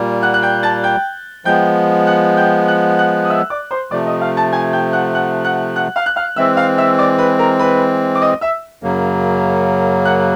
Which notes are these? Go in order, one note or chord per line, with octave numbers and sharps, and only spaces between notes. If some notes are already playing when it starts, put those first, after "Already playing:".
Already playing: A#2 G3 A#3
F#5 F#6
F#6
G5 G6
A5 A6
G5 G6
F3 G#3 B3 G5 G6
F#5 F#6
G5 G6
F#5 F#6
F#5 F#6
D#6
E5 E6
D5 D6
C5 C6
C3 F3 A3 D5 D6
D#5 D#6
F5 F6
A5 A6
G#5 G#6
G5 G6
F#5 F#6
F#5 F#6
F#5 F#6
F#5 F#6
F5 F6
F#6
F5 F6
E3 G#3 C4 E5 E6
F5 F6
E5 E6
D5 D6
B4 B5
A#4 A#5
B4 B5
D6
D#5 D#6
E5 E6
F#2 C#3 F#3 A#3
F#5 F#6